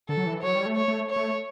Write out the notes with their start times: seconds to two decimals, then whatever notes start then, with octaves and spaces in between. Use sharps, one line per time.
0.09 D3 A4
0.17 F#3
0.26 E3
0.43 F#3 C#5
0.55 G3
0.66 A3
0.76 C#5
0.88 A3
1.10 C#5
1.16 A3